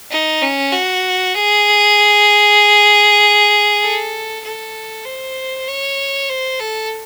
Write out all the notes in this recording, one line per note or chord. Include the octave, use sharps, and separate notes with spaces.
D#4
C#4
F#4
G#4
A4
A4
C5
C#5
C5
A4